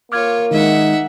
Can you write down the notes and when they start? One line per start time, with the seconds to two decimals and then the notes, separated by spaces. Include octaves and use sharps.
0.12 A#3 F4 C#5 D6 F6 G#6
0.51 D#3 G#3 D#4 E5 F#5